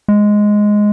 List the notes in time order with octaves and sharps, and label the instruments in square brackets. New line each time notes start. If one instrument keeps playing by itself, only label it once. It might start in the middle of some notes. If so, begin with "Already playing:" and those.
[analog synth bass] G#3